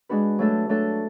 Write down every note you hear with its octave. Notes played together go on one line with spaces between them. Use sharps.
G#3 D4 F#4 B4
F#3 A3 D4 A4
F#3 A3 D4 A4